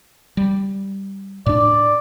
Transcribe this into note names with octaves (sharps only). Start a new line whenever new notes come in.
G3
A2 D4 D5